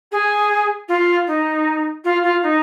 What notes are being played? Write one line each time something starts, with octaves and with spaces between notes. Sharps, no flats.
G#4
F4
D#4
F4
F4
D#4